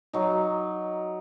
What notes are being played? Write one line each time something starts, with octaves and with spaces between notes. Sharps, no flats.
F#3 D#4